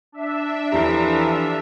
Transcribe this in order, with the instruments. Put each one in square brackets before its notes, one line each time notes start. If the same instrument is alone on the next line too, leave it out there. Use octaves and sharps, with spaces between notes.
[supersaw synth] D4 E5
[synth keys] E2 E4 A#5 [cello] E3 F3 [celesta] G4 A4